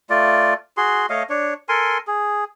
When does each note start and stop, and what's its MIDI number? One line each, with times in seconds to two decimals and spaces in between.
0.10 0.54 57
0.10 0.54 65
0.10 0.54 74
0.77 1.06 66
0.77 1.06 68
0.77 1.06 84
1.10 1.23 57
1.10 1.23 73
1.10 1.23 75
1.10 1.23 77
1.30 1.54 62
1.30 1.54 73
1.69 1.98 69
1.69 1.98 70
1.69 1.98 80
1.69 1.98 84
2.07 2.44 68